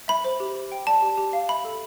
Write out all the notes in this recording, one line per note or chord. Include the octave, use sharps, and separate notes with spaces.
E5 B5
C5
G4
G4
G5
D5 A5
G4
G4
F5
E5 B5
A4